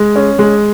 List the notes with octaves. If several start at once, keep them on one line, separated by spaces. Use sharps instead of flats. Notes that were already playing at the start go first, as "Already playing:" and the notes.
Already playing: G#3
C#4
G#3